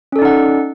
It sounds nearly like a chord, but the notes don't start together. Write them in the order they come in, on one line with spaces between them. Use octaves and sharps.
C#4 A4 D5 D#4 F#5